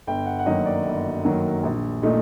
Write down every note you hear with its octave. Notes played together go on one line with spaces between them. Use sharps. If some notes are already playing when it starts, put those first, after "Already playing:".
G1 G5
F#5
F#5
F#2 D#3 F#3 A#3 D#5
D5
G1
F#2 D#3 F#3 A#3
A#1
A#2 A3 D#4